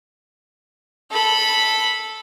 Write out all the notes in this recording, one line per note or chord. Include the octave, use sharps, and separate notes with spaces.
A4 B5